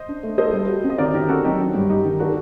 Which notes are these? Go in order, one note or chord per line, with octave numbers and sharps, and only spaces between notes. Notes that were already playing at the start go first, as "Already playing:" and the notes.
Already playing: C5 D#5
D4
A3
A4 C5 D#5
G3
F#4
C4
D#5
D#3 A#4 D5
D#3 G4 A#4
C4 F#4 A4
F#3 D#4 G4
D4
G2
G3 D#4 G4
D#3
D4 F#4 A4